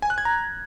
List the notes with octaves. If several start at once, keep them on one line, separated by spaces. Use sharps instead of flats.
G#5
F#6
G#6
A#5